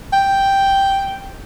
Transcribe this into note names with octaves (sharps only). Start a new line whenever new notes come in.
G5